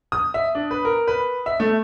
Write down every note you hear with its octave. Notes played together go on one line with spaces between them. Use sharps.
D#6
E5
D4
B4
A#4
B4
E5
A3